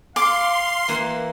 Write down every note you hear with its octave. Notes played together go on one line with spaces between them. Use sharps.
F5 C6 D6
E3 A#3 F#5